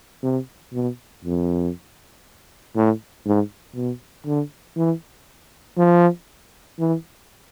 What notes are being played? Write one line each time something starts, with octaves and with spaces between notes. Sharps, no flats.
C3
B2
F2
A2
G#2
B2
D3
E3
F3
E3